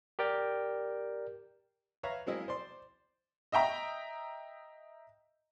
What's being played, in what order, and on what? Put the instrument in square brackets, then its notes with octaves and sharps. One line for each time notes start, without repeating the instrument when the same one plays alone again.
[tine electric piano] G4 A#4 D5 G5
[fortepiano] B4 C#5 E5 F5 A#5
F#3 G#3 A#3 C4 E4 D#5
C5 D5 C6
[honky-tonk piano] D#5 E5 G5 A#5